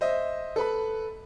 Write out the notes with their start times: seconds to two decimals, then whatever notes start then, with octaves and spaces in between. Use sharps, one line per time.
0.01 C5 D#5 E5
0.56 A4 B4 B5